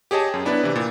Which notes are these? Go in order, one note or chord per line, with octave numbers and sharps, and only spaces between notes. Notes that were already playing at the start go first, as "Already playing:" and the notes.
G4 G#4 C#5 D#5 A5
F#2
B3 D4 E4 B4
C3 E3
A#2